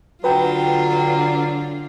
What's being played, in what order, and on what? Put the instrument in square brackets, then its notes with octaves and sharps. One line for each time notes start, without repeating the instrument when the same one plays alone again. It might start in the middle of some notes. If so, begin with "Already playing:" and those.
[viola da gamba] D3 F4 [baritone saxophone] F#3 [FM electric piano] B4 G5